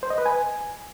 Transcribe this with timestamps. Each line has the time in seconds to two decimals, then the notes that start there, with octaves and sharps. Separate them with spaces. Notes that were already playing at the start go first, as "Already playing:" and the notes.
0.03 C5
0.10 D#5
0.18 B4
0.26 G#5